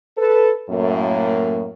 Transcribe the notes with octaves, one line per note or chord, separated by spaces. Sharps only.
A4 B4
F#2 A2 A#3